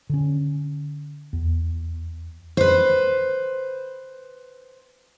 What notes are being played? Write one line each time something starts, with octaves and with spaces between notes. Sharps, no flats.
D3 C#4
E2
B4 C5